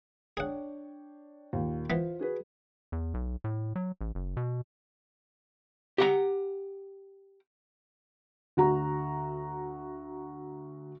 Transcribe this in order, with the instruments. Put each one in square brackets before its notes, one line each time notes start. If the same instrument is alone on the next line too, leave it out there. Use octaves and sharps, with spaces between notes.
[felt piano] D4 C#5 G5 [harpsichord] G#4 F#5
[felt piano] D#2 A#2
[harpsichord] E3 B3 [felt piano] F4 C5
[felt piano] F#4 G#4 B4
[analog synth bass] E2
B1
A2
F#3
A1
F#1
B2
[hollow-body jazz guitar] G4 F#5 A#5
[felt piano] D2 F#4 A#5